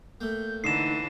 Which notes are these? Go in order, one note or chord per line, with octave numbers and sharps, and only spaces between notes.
A2 A#3 G6
D3 E3 D#4 C7 E7